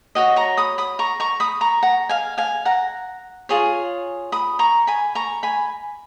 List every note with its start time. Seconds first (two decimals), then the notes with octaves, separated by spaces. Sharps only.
0.15 F#4 C#5 D#5 F#5
0.36 A#5 C#6
0.57 B5 D#6
0.78 B5 D#6
0.99 A#5 C#6
1.20 A#5 C#6
1.40 B5 D#6
1.61 A#5 C#6
1.83 F#5 A#5
2.09 F5 G#5
2.38 F5 G#5
2.65 F#5 A#5
3.49 F4 G#4 C#5
4.32 B5 D#6
4.59 A#5 C#6
4.87 G#5 B5
5.15 A#5 C#6
5.43 G#5 B5